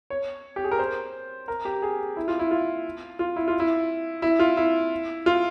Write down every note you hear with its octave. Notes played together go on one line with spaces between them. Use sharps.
C#5
G4
G#4
A#4
C5
A#4
G4
G#4
E4
F4
E4
F4
F4
E4
F4
E4
E4
F4
E4
F4